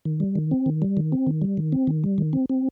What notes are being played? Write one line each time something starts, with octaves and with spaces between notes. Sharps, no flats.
D#3
G3
D#3
C4
D#3
G3
D#3
C4
D#3
G3
D#3
C4
D#3
G3
D#3
C4
C4